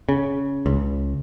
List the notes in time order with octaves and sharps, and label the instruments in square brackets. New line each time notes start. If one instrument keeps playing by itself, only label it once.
[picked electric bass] C#3
C#2